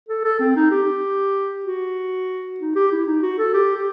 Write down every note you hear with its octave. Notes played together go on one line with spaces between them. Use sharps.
A4
A4
C4
D#4
G4
F#4
D#4
G4
E4
D#4
F#4
A4
G4
G4